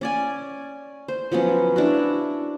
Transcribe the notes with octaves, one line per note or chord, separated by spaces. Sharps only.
C#4 D5 G#5
C5
F3 F#3 B3 C#4
D4 E4 F#4